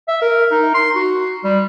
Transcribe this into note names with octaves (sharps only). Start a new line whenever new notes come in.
E5
A#4
D#4
C6
F#4
G3